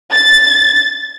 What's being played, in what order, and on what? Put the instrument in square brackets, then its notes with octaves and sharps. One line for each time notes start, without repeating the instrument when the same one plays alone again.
[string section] A6